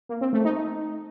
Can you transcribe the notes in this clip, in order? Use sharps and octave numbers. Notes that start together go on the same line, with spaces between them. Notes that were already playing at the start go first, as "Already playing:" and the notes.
A#3
C4
A3
D#4